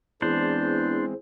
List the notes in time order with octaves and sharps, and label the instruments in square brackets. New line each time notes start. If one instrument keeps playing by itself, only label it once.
[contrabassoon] E2 [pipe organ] E3 G#3 C4 [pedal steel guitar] D4 C5